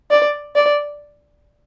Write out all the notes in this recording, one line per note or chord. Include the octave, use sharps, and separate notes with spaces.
D5
D5